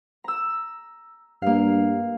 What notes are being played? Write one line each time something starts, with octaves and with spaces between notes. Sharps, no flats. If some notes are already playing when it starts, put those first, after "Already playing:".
A#5 E6
G2 A#3 F5